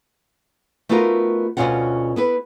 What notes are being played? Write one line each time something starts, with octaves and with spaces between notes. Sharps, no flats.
A3 B3 D#4 F4 F#4 A#4
D2 G#2 B2 C#4 F4 F#5
B3 E4 B4